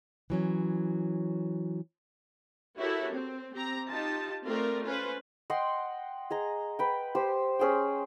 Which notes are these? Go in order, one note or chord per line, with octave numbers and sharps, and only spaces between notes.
E3 F#3 C#4
E4 F#4 G4 A4 A#4 C#5
C4
C4 G4 A#5
D#4 F4 G4 A5
A3 C4 F4 A#4 D5
C#4 F4 B4 C5
D#5 F#5 G5 C6
G#4 D#5 A#5
B4 G5
G4 C5
C#4 G#4 C5 G5